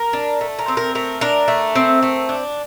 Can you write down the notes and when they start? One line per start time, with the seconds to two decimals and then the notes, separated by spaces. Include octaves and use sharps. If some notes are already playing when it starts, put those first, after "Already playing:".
Already playing: A#4
0.13 D4
0.41 A3
0.59 A#4
0.68 C4
0.77 A#4
0.95 A3 A#4
1.21 D4 A#4
1.48 A3
1.75 C4
2.03 A3
2.29 D4